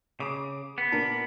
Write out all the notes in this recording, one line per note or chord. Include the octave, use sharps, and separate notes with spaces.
C#3 D6 D#6
B3
A#2 D4 A#4